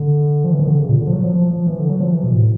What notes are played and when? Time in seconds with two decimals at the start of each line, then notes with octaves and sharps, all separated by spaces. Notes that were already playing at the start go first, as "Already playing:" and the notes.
Already playing: D3
0.44 F3
0.52 E3
0.60 D#3
0.67 D3
0.78 C#3
0.89 A#2
1.01 D3
1.07 F3
1.13 F#3
1.23 F3
1.34 F3
1.51 F3
1.67 E3
1.79 D3
1.89 F#3
2.00 F3
2.12 E3
2.23 B2
2.34 A2